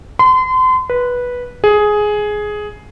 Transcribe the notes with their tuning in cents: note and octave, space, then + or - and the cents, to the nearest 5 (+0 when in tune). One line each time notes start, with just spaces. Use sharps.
C6 -35
B4 -10
G#4 +10